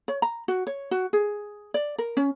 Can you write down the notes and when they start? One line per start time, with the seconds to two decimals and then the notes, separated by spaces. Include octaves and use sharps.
0.08 C#5
0.22 A#5
0.48 F#4
0.67 C#5
0.91 F#4
1.13 G#4
1.74 D5
1.98 A#4
2.17 C#4